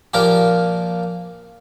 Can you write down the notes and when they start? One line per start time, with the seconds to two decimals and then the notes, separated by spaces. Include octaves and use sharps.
0.14 A#2 F3 A#3 G4 A#4